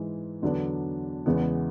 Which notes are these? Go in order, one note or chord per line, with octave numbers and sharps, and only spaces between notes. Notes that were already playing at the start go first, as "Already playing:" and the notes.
Already playing: G#2 E3 G#3
E2 D3 F#3 B3 D4
E2 C#3 E3 G#3 B3